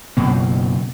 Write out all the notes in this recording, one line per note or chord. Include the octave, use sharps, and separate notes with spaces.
F#1 F#2 B2 A#3